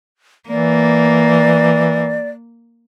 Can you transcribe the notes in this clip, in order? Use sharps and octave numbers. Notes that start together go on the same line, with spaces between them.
E3 A#3 D5